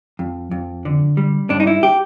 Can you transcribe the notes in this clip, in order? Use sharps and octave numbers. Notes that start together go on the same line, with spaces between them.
F2
F2
D3
G3
G2 D4
D#4
E4
G4